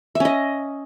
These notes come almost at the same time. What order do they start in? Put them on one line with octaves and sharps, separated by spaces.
E5 C#4 D#5